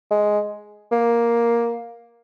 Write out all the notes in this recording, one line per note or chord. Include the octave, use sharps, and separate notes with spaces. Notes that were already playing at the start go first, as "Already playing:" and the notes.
G#3
A#3